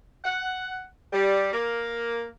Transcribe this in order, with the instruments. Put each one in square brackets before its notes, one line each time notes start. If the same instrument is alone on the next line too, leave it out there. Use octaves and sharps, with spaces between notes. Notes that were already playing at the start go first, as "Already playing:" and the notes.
[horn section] F#5
G3
A#3